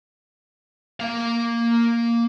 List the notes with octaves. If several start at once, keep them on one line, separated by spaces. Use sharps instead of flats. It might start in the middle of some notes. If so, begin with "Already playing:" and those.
A#3 F5